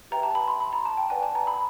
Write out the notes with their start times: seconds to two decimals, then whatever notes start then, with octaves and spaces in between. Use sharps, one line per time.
0.11 G4 B4 E5 G5 A#5
0.23 A5
0.35 B5
0.48 C6
0.60 B5
0.73 A#5
0.85 A5
0.97 G5
1.10 B4 D5 F#5 G#5
1.23 A5
1.35 A#5
1.47 B5